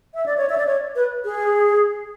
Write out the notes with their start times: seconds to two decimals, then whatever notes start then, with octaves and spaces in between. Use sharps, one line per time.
0.14 E5
0.26 D5
0.37 C#5
0.49 E5
0.58 D5
0.67 C#5
0.96 B4
1.25 G#4